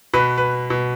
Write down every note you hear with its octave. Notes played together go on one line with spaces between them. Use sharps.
B2 B4
B4
B2